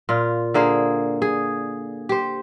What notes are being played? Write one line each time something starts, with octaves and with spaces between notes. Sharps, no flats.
A#2 F4
D3 A#3 G#4 C5
G#4
G4 C5